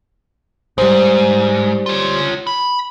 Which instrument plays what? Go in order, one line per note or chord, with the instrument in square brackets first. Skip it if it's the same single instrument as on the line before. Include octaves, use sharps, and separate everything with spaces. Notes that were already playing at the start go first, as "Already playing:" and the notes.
[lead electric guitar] G#2 [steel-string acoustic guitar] G3 C5
[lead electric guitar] F4 C#5
B5